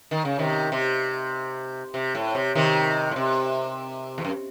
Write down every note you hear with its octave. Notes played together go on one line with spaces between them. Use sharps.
D#3
C#3
C3 D#3
C3
C3
A2
C3
C3 D#3
A2
C3
E2
F#2